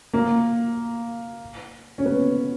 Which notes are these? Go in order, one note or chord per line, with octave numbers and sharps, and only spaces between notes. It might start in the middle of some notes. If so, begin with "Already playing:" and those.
A#3
C#4
B3